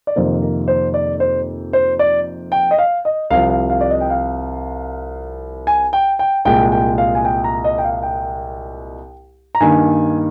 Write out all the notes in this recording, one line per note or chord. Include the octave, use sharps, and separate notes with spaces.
D5
F2 C3 D#3 A#3 C5
A#4
C5
D5
C5
C5
D5
G5
D#5
F5
D#5
C2 C3 F3 F5
F5
F5
D5
D#5
G5
F5
G#5
G5
G5
C2 A#2 G#3 G5
G5
F5
G#5
G5
A#5
D#5
G5
F5
G5
A#5
G2 D#3 A#3 G#5